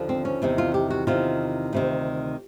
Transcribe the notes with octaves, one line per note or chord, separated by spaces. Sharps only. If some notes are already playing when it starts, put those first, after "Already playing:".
Already playing: D#2 D3 F3
C4
C#4
E2 C3 D#3
F4
G4
F#4
E2 C3 D#3 F4
D2 C3 D#3